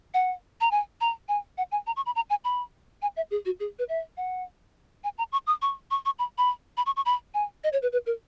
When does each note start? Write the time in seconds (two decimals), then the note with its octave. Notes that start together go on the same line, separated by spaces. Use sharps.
0.14 F#5
0.61 A#5
0.71 G#5
1.01 A#5
1.29 G#5
1.58 F#5
1.72 G#5
1.87 A#5
1.96 C#6
2.06 B5
2.16 A#5
2.30 G#5
2.44 B5
3.02 G#5
3.17 E5
3.31 G#4
3.46 F#4
3.60 G#4
3.79 B4
3.89 E5
4.17 F#5
5.04 G#5
5.18 A#5
5.32 C#6
5.47 D#6
5.62 C#6
5.91 C#6
6.06 C#6
6.19 B5
6.38 B5
6.77 B5
6.86 C#6
6.96 C#6
7.06 B5
7.34 G#5
7.64 D#5
7.73 C#5
7.82 B4
7.92 B4
8.06 A#4